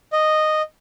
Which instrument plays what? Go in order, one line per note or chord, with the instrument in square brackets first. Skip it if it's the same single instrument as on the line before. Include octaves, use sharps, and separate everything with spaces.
[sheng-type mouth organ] D#5